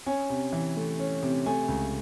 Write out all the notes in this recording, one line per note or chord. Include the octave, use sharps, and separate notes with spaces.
C#4 G#5
C3
E3
A3
C#4
C3
A3 G#5
C#2